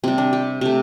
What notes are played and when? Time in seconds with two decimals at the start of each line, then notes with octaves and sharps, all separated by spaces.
0.04 C3 G3 C4
0.18 D4
0.33 G4
0.61 C3 A3